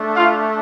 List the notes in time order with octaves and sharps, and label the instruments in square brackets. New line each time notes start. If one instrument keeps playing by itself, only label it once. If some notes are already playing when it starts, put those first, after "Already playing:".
Already playing: [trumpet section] A3 D4
F4 F5